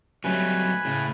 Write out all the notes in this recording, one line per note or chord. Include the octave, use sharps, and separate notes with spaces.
F#3 G3 A3 C#4 B4 G#5
A2 C#3